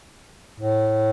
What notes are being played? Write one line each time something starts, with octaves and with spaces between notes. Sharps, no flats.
A2